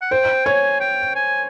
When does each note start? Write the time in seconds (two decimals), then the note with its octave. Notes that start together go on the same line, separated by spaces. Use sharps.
0.02 F#5
0.11 C5 G5
0.45 C#5 G#5
0.80 G5
1.15 G#5